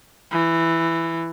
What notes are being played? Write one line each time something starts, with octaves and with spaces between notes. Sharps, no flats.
E3